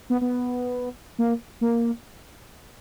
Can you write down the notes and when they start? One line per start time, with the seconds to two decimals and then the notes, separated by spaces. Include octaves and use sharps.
0.10 B3
0.21 B3
1.19 A#3
1.61 A#3